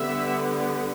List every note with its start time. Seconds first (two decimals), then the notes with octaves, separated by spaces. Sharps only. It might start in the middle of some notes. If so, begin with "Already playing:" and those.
Already playing: D3 G3 B3 E5